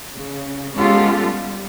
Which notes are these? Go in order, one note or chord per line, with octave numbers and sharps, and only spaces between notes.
C#3
G#3 B3 C#4 F4 G4 A4
G3